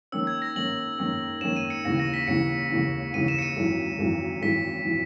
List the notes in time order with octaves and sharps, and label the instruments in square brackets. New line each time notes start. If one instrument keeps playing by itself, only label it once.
[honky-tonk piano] D#3 A#3 C#4 [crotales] E6
[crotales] G#6
A#6
[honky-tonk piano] D#3 A#3 C#4 [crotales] F#7
[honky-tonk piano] D#3 A#3 C#4
[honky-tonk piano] D#3 A#3 C#4 [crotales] E7
[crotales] D#7
C#7
[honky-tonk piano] D#2 C#3 E3 [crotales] A#6
[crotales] A#6
B6
[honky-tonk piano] D#2 C#3 E3 [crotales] C#7
[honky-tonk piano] D#2 C#3 E3
[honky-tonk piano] D#2 C#3 E3 [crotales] D#7
[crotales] E7
C#7
D#7
[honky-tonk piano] G#1 F#2 E3
G#1 F#2 E3
[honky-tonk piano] G#1 F#2 E3 [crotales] B6
[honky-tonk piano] E3